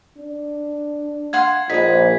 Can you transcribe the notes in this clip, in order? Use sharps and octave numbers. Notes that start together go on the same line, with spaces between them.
D4
F5 F#5 C6 G#6
A#1 D#4 B4 B6